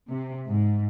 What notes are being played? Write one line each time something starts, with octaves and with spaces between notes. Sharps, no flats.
C3
G#2